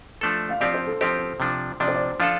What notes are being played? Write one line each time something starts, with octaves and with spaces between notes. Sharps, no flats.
F3 A3 D4 A4
F5
F3 C4 G4 D5
C5
A4
F3 C4 G4 C5
C3 F3 D4
C3 F3 D4 D5
C5
D5
F3 D4 F4 A4 F5